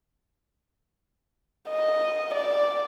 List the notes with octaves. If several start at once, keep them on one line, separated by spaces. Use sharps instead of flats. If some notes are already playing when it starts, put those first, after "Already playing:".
D#5
D5